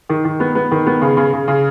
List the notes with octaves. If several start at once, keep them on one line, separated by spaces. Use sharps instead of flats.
D#3
D#3
B3
B3
D#3
B3
C#3
C#3
C#3
C#3